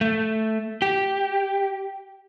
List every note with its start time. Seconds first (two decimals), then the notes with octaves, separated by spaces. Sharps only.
0.01 A3
0.82 G4